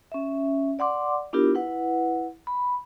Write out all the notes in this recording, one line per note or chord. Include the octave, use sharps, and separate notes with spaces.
C#4 E5
D5 F#5 C6 D6
B3 D4 E4 F4 G4 A#4
E4 B4 F#5
B5